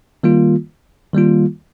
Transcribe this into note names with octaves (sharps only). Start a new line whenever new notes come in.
D#3 G3 A#3 F4
D#3 G3 A#3 F4